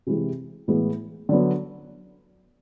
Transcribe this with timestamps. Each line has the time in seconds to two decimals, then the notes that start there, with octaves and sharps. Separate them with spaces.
0.07 C3 E3 G#3 C4
0.68 A2 E3 G#3 B3 E4
1.29 D3 F#3 B3